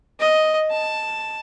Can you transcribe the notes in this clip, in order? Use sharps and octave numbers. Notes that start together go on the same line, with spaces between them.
D#5
A5